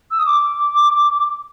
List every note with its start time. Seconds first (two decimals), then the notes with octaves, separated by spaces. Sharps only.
0.11 E6
0.19 D#6
0.26 D6